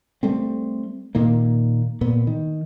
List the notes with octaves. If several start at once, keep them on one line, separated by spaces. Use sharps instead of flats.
G3 A3 C4
A#2 D#3 A#3
A#2 B3
D#3